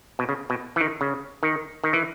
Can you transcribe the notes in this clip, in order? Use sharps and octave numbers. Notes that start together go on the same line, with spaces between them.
B2
C#3
B2
E3
D#3
C#3
D#3
D#3
E3